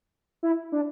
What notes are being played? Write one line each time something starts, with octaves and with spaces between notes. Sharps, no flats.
E4
D4